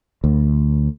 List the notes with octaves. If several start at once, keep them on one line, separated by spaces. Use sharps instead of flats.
D2